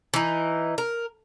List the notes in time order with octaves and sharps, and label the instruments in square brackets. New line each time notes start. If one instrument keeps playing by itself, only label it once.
[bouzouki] E3 D#4
A#4